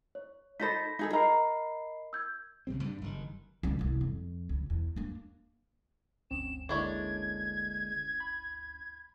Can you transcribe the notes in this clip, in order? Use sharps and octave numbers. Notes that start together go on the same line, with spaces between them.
C#5
D#4 A4 C5 B5 A#6 B6
D#4 G#4 A4
A#4 D#5 A#5 B5 C7
E6 G6 G#6
B1 C#3 G3 C4
G2 G3 D4
F#1 G2 A#2 D#3
C#2 G3
G1 C2
F2
C#2
E2
A#3 D4
G1 D2 C4 C#4 E7
D3 G#3 A#3 D4 E4 C#5 G#6
B5